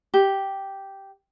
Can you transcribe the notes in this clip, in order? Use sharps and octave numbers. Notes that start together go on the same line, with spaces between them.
G4